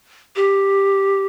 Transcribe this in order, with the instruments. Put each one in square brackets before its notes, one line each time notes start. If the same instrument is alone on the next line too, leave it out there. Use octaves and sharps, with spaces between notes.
[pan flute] G4